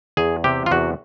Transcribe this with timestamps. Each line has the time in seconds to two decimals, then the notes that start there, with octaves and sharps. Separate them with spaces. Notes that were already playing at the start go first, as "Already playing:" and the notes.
0.17 E2 G#4
0.44 C3 G4
0.66 F4
0.71 E2 F#4